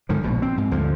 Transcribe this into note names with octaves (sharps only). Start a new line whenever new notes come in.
G#2 D3 D#3 F3
A#1 B2
C4
G#2
D2 D3 F3